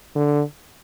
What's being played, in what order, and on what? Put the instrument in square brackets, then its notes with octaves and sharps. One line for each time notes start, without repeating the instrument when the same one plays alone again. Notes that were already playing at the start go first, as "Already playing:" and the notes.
[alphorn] D3